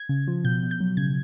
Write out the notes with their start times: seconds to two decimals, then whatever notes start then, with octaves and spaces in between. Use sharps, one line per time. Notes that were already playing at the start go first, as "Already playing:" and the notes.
Already playing: G#6
0.09 C#3
0.27 F3
0.44 B2 G6
0.63 B2
0.71 G6
0.80 F#3
0.97 C#3 G#6